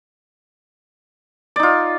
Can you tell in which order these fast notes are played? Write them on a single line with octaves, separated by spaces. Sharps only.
D5 D#4 F4